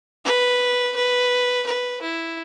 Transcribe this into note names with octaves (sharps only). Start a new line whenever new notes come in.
B4
B4
B4
E4